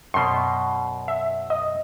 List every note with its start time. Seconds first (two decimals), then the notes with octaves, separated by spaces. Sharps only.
0.14 F#2 B2 C6
1.08 E5
1.50 D#5